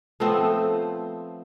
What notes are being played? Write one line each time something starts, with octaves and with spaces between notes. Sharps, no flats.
F3 A3 B3 C4